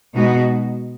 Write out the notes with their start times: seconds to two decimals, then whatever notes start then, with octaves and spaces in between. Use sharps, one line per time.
0.15 B2 G#3 B3 D#4 F#4